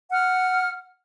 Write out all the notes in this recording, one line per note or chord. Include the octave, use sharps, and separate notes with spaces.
F#5 F6